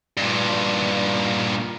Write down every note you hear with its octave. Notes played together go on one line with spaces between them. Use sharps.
G2 A#2